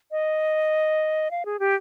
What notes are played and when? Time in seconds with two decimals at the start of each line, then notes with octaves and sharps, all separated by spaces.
0.11 D#5
1.31 F5
1.45 G#4
1.59 G4